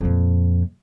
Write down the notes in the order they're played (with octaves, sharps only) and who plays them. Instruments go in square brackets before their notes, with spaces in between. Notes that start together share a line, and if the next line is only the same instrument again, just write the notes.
[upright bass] F2 A#2